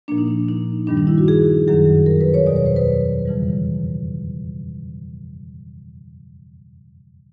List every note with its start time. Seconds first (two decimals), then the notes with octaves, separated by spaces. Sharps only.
0.08 A#2 F3 A#3 D4
0.18 D#4
0.28 D4
0.49 D#4
0.87 G2 D#3 G3 D4
0.97 D#4
1.07 E4
1.18 F#4
1.28 G#4
1.68 F#2 D#3 F#3 G#4
2.06 A#4
2.21 B4
2.34 C#5
2.46 E2 B2 F#3 D5
2.56 C#5
2.66 C5
2.76 B4
3.25 F2 C#3 E3 G3